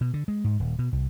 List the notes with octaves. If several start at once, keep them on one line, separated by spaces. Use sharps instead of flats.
B2
D3
G#3
G#2
D#1
B2
C2